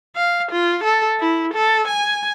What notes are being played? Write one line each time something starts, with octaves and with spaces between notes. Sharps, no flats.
F5
F4
A4
E4
A4
G#5